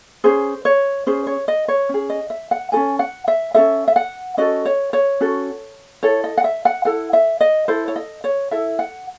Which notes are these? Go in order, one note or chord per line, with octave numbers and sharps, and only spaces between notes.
C#4 G#4 C5
C#5
C#4 G#4 C5
C#5
D#5
C#5
C#4 G#4
D#5
E5
F#5
C#4 F#4 A4 G#5
F#5
E5
C#4 F#4 A4 E5
E5
F#5
C#4 F#4 A4 D#5
C#5
C#5
C#4 F#4 A4
E4 A4 C#5
D#5
F#5
E5
F#5
E4 A4 F#5
E5
D#5
E4 A4 C5
C#5
D#5
C#5
E4 A4 E5
F#5